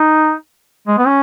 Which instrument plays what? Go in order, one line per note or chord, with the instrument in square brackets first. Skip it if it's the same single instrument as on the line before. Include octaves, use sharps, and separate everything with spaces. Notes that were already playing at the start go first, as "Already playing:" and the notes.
Already playing: [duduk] D#4
G#3
B3
C#4